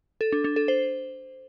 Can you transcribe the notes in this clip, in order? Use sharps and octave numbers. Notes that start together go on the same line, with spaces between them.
A4
D4
D4
A4
C5